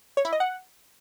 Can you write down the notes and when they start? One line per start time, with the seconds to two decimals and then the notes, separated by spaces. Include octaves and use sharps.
0.17 C#5
0.25 E4
0.32 D#5
0.40 F#5